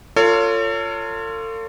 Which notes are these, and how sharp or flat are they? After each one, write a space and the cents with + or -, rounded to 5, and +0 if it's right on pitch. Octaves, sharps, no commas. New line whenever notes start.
F4 +0 A4 +40 C#5 +15